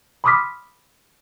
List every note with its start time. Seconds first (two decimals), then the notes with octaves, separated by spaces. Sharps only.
0.24 B5 C6 D6 D#6 F6 B6